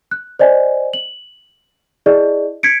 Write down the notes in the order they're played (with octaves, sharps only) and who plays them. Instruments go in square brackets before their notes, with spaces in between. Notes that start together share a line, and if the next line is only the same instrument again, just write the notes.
[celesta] F#6
C5 D5 D#5 G#5
F#7
E4 G#4 D5 D#5
G#6 B6 C#7 D7